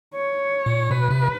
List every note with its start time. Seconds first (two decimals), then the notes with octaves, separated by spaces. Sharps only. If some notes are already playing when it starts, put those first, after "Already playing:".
0.15 C#5
0.66 A#2
0.91 B2 B4
1.11 C3